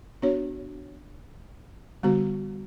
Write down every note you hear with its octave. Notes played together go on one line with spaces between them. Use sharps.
B3 D4 F#4 C#5
D3 G3 B3 F#4